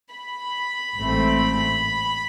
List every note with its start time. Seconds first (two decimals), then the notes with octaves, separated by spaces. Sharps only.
0.12 B5
0.97 A1 G#2 E3 A3 C4